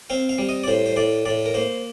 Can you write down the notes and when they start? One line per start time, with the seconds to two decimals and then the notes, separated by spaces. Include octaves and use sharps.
0.10 C4 F5
0.29 F5
0.38 G3
0.49 D#5
0.64 D5
0.68 A2 C5
0.86 C5
0.96 A2 D5
1.25 A2 D5
1.46 A#4
1.54 A#3 C5